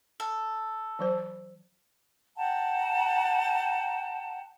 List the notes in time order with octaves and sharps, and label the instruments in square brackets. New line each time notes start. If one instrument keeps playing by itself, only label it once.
[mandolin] A4
[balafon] E3 F#3 C5
[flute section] F#5 G5 A5 A#5